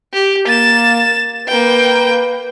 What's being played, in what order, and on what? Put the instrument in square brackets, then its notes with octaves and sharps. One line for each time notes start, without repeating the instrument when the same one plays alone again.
[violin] G4
[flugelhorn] A#3 [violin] A6 E7
[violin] A#3 G5 [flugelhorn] B4